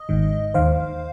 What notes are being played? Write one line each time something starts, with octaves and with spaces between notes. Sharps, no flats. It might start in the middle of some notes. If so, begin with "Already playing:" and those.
Already playing: D#5
G#1 G#2 D#3
D#2 D#3 C5 F5